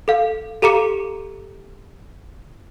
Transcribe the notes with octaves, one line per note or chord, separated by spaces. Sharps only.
A4 F5
G4 A4 F5 A#5 D6 C#7